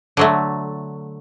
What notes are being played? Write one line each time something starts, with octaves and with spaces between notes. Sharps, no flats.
D3 F#3 A3